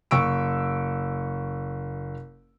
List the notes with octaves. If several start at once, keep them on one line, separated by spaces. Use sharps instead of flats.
F#1 C#6 E6 D7